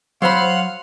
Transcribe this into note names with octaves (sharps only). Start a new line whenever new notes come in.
F#3 C5 F5 F#5 B5 C6